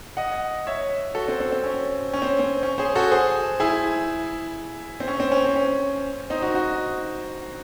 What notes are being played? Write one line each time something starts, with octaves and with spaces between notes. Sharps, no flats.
D#5 F#5
C#5 E5
F#4 A4
C4
C4
C4
C#4
C#4
C4
C4
C#4
G#4 C5
F#4 A4
G#4 C5
E4 G#4
C4
C#4
C4
C#4
C4
C#4
C4 D#4
D#4 F#4
D#4 F#4